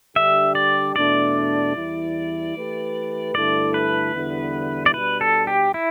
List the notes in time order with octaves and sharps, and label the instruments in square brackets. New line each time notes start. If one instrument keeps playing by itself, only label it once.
[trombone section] D3 G3 D4 G4 [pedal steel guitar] E5
[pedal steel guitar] D5
[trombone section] E2 B2 A3 D4 [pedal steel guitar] D5
[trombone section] E2 E3 G3 E4
E3 A3 G4 B4
[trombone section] G2 D3 A3 E4 A4 [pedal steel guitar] D5
[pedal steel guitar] B4
[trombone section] E2 D3 G3 B3 E4
[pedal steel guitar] D5
[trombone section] B2 G3 D4 [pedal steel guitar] B4
[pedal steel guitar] A4
G4
E4